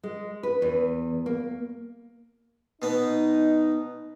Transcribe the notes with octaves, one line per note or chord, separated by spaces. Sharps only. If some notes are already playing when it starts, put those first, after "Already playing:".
G#3
B4
E2
A#3
B2 B3 D#4